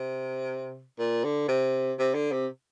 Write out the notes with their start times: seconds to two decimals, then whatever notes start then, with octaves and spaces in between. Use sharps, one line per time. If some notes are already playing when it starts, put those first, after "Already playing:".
Already playing: C3
0.99 A#2
1.24 D3
1.48 C3
1.99 C3
2.14 D3
2.32 C3